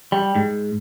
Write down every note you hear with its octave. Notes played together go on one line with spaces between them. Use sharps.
G3
G#2